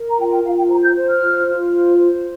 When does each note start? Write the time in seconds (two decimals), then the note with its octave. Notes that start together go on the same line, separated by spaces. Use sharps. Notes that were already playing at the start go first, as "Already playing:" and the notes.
Already playing: A#4
0.09 A#5
0.19 F4 G5
0.31 G5
0.44 F4 F5
0.57 G5
0.69 C5 A#5
0.83 G6
0.95 C5
1.09 F6
1.21 F4
1.46 F4
1.72 C5
1.98 C5